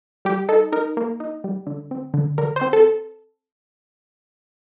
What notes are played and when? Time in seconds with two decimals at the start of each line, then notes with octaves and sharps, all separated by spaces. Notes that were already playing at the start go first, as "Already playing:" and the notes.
0.25 G3 G4
0.49 D#4 A4
0.72 D#4 A#4
0.97 A#3
1.20 D#4
1.44 G3
1.67 D3
1.91 C4
2.14 D3
2.38 D3 A#4
2.56 C5
2.61 C4
2.73 A4